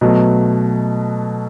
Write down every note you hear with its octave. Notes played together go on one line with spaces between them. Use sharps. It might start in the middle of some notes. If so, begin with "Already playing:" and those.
B2 F#3 A3